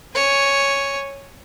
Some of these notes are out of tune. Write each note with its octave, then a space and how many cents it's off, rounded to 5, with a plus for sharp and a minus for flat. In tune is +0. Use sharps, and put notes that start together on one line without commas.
C#5 +0 G#5 -5